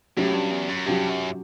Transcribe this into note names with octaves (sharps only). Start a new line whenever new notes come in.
A2 F#3 C#4 G4
G2
E2
F#2
G2 F#3 C#4 G4
F#2